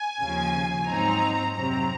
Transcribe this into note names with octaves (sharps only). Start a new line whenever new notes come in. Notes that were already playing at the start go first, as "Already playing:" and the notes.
Already playing: G#5
D#2 C#3 F3
G#2 F#3 C4 D#4 A#5
F2 C3 F#3 C4 A#5